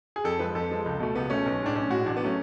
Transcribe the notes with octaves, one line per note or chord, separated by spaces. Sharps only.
G#4
F2 A4
F3 G#3 B4
F2 A4
F3 G#3
C#2
B2 A3
C#2 B3
B2 A3 C#4
B1
A2 G#3 D4
B1 C#4
A2 G#3 F#4
A1 D4
B3
F#3 A3 C#4